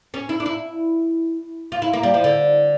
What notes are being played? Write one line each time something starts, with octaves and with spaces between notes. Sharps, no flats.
C#4
E4
D4
E4
F4
E4
A#3
G3
F3
D3